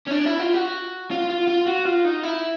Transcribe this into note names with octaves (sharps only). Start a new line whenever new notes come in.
C#4
D4
E4
F4
F#4
F4
F4
F4
F#4
F4
D#4
E4